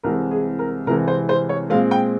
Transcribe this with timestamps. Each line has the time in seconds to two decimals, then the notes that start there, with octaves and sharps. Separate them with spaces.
0.03 C2 C3 E3 G#3 C4 A#4
0.31 G#4
0.59 A#4
0.86 C2 C3 E3 G#3 C4 A#4
1.08 C5
1.29 C5
1.49 C#5
1.70 A#2 G#3 C4 F5
1.91 G5